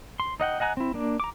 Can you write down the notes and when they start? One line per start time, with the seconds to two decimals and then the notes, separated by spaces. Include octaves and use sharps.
0.20 C6
0.40 D#4 D#5 F#5 G5
0.60 D#5 F#5 G#5 A#5 F#6
0.77 C4 E4
0.94 A#3 D4
1.20 A#5 D6